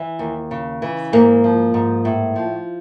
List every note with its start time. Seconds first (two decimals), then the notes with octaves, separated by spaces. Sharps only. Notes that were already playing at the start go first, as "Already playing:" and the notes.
Already playing: E3
0.19 D#2
0.51 C#3
0.82 E3
1.13 G#2 A#3
1.44 F3
1.74 G#2
2.05 A2
2.36 F3